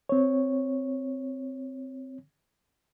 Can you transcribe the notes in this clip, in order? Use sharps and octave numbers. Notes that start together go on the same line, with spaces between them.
C4 C#5